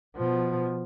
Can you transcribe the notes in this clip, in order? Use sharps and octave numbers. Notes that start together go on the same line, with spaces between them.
B2 F3